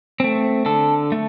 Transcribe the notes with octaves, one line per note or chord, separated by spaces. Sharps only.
A3 C4
D3 A4
A3